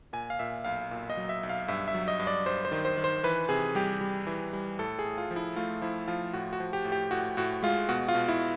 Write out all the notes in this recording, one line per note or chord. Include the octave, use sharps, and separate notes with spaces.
A#2 G#5
F5
A#2 E5
B1 F5
A#2
D#5
F#3
E5
B1
F5
G2 E5
E5
F#3
D#5
G2
D5
G2 C5
C5
D#3
C5
D#3
C5
E3 B4
C3 G#4
G3 G4
G3
E3
G3
A2 A4
G#4
A2
F4
F3
E4
A3 F4
F3 E4
F3 F4
A2 F#4
F#4
F3
G4
A2
G4
A2 F#4
A2 F#4
G#3 F4
B2 F#4
F4
B2
E4